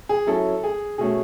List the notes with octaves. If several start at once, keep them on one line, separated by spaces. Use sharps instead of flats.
G#4
F#3 C#4 E4 A4
G#4
B2 A3 C#4 G#4